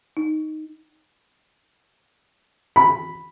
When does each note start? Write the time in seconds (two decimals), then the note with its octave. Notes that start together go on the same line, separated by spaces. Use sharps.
0.17 D#4
2.76 B5